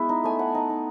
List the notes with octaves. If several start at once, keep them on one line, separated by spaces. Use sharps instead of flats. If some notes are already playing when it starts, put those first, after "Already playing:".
Already playing: G#3 B3 E4 E5
D#4
A3 G#5
D#4 F#5
D#4
D#4